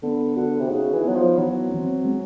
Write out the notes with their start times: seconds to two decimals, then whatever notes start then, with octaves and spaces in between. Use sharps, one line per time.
0.03 D3 B3
0.36 D3 F#4
0.60 C3
0.71 C#3 D#4
0.93 E3
1.04 F#3 B3
1.15 F3
1.38 E3 F#3
1.72 C4
2.05 G#3